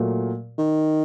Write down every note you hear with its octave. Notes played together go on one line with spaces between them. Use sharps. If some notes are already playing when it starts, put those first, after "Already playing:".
Already playing: A#2 F#3 A3
D#3